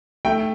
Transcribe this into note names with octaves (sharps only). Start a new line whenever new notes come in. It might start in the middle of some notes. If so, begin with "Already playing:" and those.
A3 G5